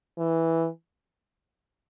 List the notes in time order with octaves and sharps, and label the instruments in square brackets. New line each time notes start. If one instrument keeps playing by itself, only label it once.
[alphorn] E3